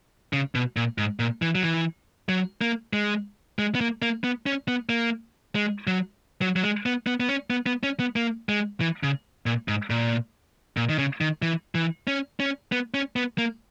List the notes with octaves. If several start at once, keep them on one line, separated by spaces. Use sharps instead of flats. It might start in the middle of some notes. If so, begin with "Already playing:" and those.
C#3
B2
A#2
G#2
A#2
E3
F#3
E3
F#3
A#3
G#3
G#3
B3
A#3
A#3
B3
C#4
B3
A#3
G#3
F#3
F#3
F#3
G#3
B3
B3
B3
C#4
B3
B3
C#4
B3
A#3
G#3
E3
C#3
A#2
G#2
A#2
A#2
D#3
C#3
D#3
E3
E3
C#4
C#4
B3
C#4
B3
A#3